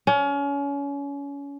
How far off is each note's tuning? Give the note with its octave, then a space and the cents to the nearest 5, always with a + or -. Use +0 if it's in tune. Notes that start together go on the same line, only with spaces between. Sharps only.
C#4 +30